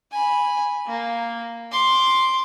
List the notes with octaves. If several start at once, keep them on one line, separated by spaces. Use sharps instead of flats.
G#5 B5
A#3
C6 D6